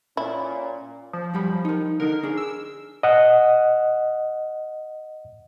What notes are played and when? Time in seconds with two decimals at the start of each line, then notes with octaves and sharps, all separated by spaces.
0.17 A#2 C#4 E4
1.13 F3
1.34 F#2 G3 B5
1.65 D#4 A#4
2.00 D3 D#4 A#4
2.23 D4 G#4
2.38 E6
3.03 D#5 F#5